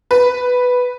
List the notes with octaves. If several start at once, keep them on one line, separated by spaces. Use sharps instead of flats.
B4